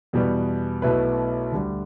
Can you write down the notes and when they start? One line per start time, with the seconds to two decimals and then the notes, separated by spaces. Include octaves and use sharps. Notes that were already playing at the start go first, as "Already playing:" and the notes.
0.13 E2 B2 G3 B3
0.82 B1 B2 A3 E4 B4
1.52 D2 D3 G3